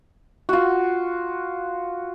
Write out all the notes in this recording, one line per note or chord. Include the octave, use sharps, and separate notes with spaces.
F4 F#4